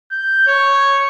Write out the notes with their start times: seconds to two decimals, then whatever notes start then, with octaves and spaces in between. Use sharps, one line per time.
0.11 G6
0.47 C#5